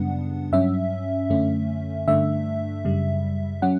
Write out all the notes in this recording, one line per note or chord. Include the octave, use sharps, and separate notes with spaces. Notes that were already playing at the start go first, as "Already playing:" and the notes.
Already playing: F#2 C#3 G3 B3 D4 F#5
G2 F#3 C#4 E5
F#2 D3 A3 C#4
G2 D3 A3 D4 E5
F#2 C#3 G3
F#3 C#4 F#5